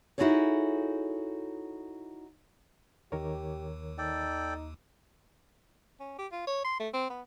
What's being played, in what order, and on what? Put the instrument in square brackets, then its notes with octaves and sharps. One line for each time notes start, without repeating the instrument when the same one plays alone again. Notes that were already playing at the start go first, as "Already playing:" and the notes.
[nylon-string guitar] D#4 E4 F#4 G#4 A4 C#5
[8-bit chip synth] D#2 [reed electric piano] D#3 A#4 C#5 [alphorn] G4
[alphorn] D#4 [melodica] A4 D5 G5
[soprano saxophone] C#4
G4
F4
C#5
C6
A3
C4
B3